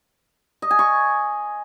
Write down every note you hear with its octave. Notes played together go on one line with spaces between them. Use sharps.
D#5
G#5
C#6